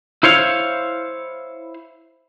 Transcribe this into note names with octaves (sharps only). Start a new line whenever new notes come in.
E4 C5 C#5 F5